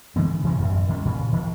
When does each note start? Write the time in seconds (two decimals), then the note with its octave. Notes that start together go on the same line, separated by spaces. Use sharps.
0.16 C#3 E3 G#3 B3
0.43 C3 E3 G#3
0.57 A1 F#2 C#3
0.89 D#3 G3 G#3 C#4
1.05 A#2 C#3
1.33 D#3 F3